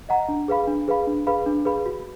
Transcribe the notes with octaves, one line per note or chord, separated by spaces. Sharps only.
D#5 F#5 A#5
D4
G#4 B4 F5 B5
D4
G#4 B4 F5 B5
D4
G#4 B4 F5 B5
D4
G#4 B4 F5 B5
F#4